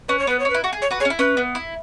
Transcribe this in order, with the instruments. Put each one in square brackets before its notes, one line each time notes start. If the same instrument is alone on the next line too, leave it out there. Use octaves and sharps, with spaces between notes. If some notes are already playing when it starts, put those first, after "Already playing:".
[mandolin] C#4 [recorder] B4
[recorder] C#5
[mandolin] B3 [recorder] B4
[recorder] C#5
[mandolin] C#4
[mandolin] E4 [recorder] B4
[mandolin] F#4
G#4
[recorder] C#5
[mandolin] F#4 B4
[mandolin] G#4 [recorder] C#5
[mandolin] C#4
E4
[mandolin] C#4 [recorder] B4
[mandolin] B3
E4